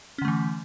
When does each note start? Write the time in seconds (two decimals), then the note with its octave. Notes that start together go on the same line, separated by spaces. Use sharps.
0.18 C#4
0.22 D3
0.25 A3
0.28 E3